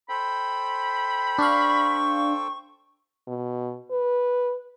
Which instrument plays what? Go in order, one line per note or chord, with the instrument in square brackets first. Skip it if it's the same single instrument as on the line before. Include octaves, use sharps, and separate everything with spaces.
[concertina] A4 C5 G5 [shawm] B5
[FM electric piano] D4 F5 [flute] C#6
[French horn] B2
B4